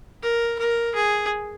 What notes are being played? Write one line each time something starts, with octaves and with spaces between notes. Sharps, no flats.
A#4
A#4
G#4